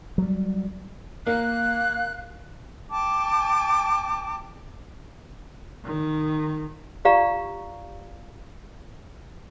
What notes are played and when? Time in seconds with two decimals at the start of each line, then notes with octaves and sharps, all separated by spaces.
0.18 F#3 G3
1.27 A#3 A#4 F5 F#6
2.90 G5 A5 D6
5.85 D#3
7.05 F4 G4 D5 F5 A#5 C#6